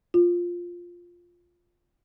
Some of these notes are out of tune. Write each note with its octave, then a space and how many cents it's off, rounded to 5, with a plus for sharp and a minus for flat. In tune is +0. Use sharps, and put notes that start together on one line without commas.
F4 +5